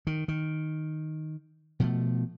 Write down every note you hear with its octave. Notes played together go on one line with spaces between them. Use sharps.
D#3
D#3
B2 F3 A3